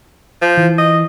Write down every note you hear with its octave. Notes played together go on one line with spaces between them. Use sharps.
F3
E3
D#5